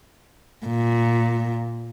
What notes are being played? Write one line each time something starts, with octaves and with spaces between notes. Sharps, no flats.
A#2